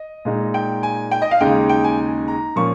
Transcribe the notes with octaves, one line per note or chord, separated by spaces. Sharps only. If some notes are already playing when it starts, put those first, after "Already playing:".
Already playing: D#5
A#2 G#3 D#4
G5
G#5
G5
D#5
F5
D#2 C#3 G#3 D#4 G5
G5
G#5
A#5
A#2 F3 A#3 C#4 C#6